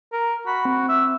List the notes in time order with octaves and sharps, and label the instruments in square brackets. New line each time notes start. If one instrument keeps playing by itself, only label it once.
[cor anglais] A#4
[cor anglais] F#4 [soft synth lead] B5
[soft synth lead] C4
[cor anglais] E5